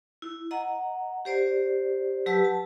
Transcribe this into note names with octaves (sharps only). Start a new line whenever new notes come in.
E4
D#5 F#5 A#5
G4 C5 D5
F#3 G4 B4 A5 E6
A5